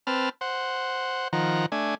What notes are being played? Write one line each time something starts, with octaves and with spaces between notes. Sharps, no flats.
C4 B4 A5 F6
C5 F#5
D#3 F3 F#5 A#5
A3 D4 G#5